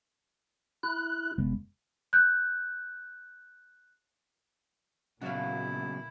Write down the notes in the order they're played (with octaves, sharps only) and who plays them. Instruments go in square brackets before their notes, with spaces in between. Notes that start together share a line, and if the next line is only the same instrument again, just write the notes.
[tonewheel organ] E4 F#6
[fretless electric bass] F1 G#3 B3
[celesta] F#6 G6
[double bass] A#2 [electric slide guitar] C#3 F#3 B3 [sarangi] E4 [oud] F#4 F5